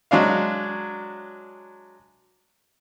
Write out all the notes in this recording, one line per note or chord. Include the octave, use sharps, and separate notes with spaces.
F#3 G#3 D4 F5